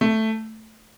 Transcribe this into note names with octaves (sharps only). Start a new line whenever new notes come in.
A3